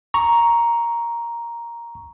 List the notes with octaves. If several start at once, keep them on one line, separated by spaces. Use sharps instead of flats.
A#5 C#6